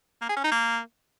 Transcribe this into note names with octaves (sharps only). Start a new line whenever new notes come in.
A#3
G#4
C#4
D#4
A#3